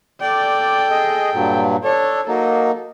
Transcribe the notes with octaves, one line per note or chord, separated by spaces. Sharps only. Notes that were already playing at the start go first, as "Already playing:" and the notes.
A4 D5 G5
G#4 D#5
G2 A#2 F#3
D4 A4 C#5
F#3 A#3 D#4 A4